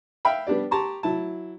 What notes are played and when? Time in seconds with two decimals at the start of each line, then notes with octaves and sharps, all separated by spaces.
0.25 E5 F5 G5 B5
0.47 G3 B3 D4 G4 D5
0.71 G4 A5 A#5 C6 C#6
1.03 F#3 E4 A5